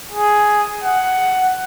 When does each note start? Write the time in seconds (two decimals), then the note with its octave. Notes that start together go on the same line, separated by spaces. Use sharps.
0.12 G#4
0.84 F#5